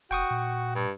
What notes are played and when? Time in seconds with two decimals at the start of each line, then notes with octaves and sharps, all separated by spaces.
0.11 F1 F#4 G5 C#6 D#6
0.31 A#2
0.75 G2